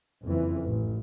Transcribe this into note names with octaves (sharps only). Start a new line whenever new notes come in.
F#1 F2 E3
A1